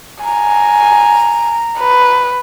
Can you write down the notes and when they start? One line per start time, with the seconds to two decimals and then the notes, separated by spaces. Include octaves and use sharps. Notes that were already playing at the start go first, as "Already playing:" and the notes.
0.24 G#5 A#5
1.79 B4